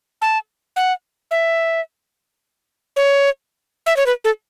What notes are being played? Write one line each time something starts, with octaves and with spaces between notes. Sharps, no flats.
A5
F#5
E5
C#5
E5
C#5
B4
A4